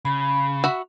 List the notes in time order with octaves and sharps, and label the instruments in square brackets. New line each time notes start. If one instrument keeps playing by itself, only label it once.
[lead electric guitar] C#3 [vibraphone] B5
[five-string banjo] F#4 E5 B5